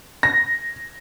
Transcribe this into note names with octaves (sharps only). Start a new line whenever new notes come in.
A#6